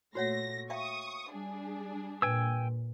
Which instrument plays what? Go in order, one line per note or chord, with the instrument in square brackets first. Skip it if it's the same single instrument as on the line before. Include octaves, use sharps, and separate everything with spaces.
[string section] A#2 A3 A#6 [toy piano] F#4 C#5 F#5
[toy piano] E5 F5 G5 [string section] C#6 D#6
[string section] G3 D4 G#4
[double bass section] A#2 [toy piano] B4 [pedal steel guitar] G5 G#5 E6